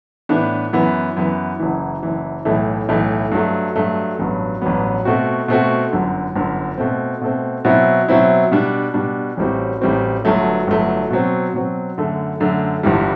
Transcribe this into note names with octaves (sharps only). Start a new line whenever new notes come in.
A2 E3 B3 D4
F#2 E3 B3
F#2 E3 B3
F#1 F#2 E3
F#1 F#2 E3
B1 A2 E3 A3
B1 A2 E3 A3
G2 F#3 A3
G2 F#3 A3
A1 G2 F#3 B3
A1 G2 F#3 B3
B2 A3 C4 F#4
B2 A3 C4 F#4
G1 F#2 D3
G1 F#2 D3
B2 A3 C4
B2 A3 C4
B2 F#3 C4 E4
B2 F#3 C4 E4
B2 G3 D4
B2 G3 D4
A1 A2 G3 C4 F#4
A1 A2 G3 C4 F#4
G1 G2 F#3 A3
G1 G2 F#3 A3
B2 F#3 C4
B2 F#3 C4
F#2 D3 A3
F#2 D3 A3
G1 G2 E3 G3